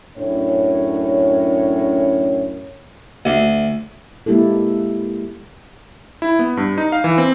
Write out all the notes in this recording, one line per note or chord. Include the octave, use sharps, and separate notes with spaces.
F#2 A2 C#4 D4 C#5
D2
G#3 A#3 E4 G4 A4
E4
B3
G2
D#4
F5
E3
C4